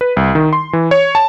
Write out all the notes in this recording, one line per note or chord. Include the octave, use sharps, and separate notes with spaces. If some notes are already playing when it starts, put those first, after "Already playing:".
B4
C2
D#3
C6
E3
C#5
A5